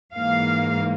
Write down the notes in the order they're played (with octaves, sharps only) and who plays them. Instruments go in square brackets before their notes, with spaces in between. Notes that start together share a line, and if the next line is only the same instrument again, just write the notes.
[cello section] G#2 E3 A#3 F5